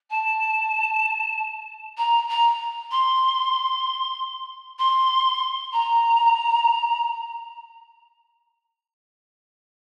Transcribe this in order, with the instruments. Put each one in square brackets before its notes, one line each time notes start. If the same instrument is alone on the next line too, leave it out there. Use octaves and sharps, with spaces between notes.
[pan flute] A5
A#5
A#5
C6
C6
A#5